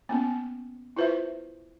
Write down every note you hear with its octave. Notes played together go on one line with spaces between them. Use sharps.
A#3 B3 C#4
E4 F4 B4 C5 E5